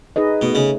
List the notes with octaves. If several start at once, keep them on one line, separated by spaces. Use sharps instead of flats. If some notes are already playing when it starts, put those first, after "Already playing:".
D#4 G#4 B4 D#5
B2 A3
C#3